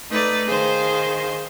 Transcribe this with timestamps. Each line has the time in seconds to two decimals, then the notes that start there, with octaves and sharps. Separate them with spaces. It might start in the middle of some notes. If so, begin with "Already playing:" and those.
0.10 A3 D#4 B4 D5
0.48 D#3 G#4 C5 F5